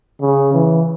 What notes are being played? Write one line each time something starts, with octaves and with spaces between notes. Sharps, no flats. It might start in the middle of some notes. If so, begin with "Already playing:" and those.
C#3
E3